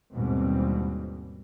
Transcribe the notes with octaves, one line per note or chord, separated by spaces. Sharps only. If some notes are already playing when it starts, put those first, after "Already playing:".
D#2 G#2 B2 E3 G3 C4